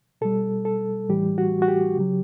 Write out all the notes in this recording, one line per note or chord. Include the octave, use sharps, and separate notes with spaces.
B2 G3 A4
A4
A2 E3 G3 G4
F#4
F#4
G4
C#3 F#3